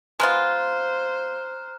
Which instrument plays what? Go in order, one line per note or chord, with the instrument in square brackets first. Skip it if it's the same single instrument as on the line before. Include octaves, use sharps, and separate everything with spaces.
[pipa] G#3 B3 F4 [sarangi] C5 [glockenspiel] A#5 F6 F#6